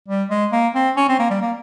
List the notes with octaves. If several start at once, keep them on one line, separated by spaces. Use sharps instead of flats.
G3
G#3
A#3
C4
C#4
C4
A#3
G3
A#3